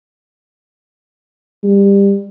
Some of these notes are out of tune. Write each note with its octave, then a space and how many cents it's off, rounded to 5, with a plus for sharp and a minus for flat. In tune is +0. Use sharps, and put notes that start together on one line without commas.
G3 +20